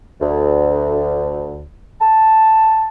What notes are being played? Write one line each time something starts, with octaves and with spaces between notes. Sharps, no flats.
D2
A5